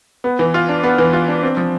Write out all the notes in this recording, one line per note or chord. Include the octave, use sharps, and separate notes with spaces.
B3
E3
F4
D4
B3
E3
F4
D4
C4
F3